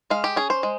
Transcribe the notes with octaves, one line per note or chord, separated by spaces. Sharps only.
G#3 F5
G4
C#4 G#4
C5
G#3